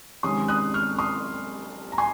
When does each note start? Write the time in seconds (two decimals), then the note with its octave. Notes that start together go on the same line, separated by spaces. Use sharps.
0.23 C3 D#3 G#3 C#4 C6 D#6
0.48 D#6 F#6
0.74 C#6 F6
0.98 C6 D#6
1.92 A#5
1.98 G#5 C6